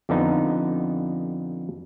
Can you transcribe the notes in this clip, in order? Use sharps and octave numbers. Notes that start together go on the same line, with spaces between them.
F2 D3 B3 D#4